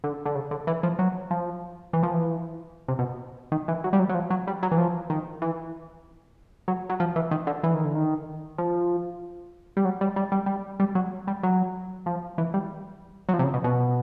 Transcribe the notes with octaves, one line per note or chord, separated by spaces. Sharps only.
D3
D3
C#3
D3
E3
F3
F#3
F3
E3
F3
E3
C3
B2
D#3
E3
F#3
G3
F#3
F#3
F3
F#3
G3
F#3
E3
F3
D#3
E3
F#3
F#3
F3
E3
D#3
D3
E3
D#3
D3
D#3
F3
G3
F#3
G3
G3
G3
G3
G3
F#3
G3
F#3
F3
E3
G3
F#3
F3
C3
C#3
B2
B2